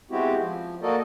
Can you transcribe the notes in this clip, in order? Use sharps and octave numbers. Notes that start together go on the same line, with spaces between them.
G#3 B3 C4 E4 F#4 G4
F3
A#3 F#4 A4 A#4 D5 D#5